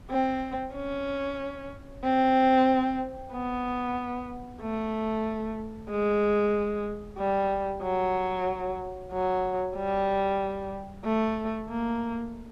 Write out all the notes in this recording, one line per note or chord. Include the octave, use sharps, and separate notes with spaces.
C4
C#4
C4
B3
A3
G#3
G3
F#3
F#3
G3
A3
A#3